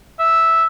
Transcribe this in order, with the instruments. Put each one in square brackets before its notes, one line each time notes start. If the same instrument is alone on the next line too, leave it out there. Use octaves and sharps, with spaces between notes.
[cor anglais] E5